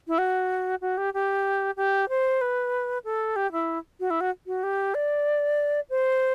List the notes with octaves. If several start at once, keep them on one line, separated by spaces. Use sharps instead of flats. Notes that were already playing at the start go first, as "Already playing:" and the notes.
E4
F#4
F#4
G4
G4
G4
C5
B4
A4
G4
E4
F#4
E4
F#4
F#4
G4
D5
C5